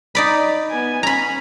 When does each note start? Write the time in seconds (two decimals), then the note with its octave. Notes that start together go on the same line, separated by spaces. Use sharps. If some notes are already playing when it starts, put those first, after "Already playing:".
0.15 D#4 D5 B5
0.71 B3 G#5
1.03 C#4 A#5 B5